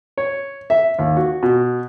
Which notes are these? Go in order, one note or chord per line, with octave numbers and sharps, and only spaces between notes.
C#5
E5
D#2
F#4
B2